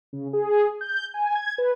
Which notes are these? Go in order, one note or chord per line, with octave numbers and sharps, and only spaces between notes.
C#3
G#4
G6
G#5
G#6
B4